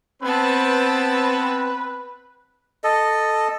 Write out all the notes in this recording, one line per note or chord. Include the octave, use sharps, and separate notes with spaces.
B3 C4 B4 A5
A4 D#5